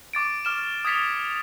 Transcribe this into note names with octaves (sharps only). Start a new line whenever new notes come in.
C#6 D6 A6 D7
D6 F6 E7
D#6 G#6 A6 B6 C#7 F7